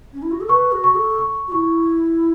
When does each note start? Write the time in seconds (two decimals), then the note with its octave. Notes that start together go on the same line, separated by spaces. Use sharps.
0.13 C#4
0.22 E4
0.31 F#4
0.41 A4
0.49 B4 C#6
0.72 F#4
0.84 C#6
0.95 A4
1.18 C#6
1.48 F#4
1.52 E4 C#6